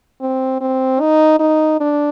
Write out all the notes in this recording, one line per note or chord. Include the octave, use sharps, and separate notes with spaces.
C4
C4
D#4
D#4
D4